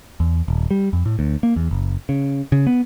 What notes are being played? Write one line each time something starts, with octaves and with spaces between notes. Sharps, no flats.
E2
D#1
G3
F2
A2
D2
A#3
E2
F#1
C#3
C#3
B3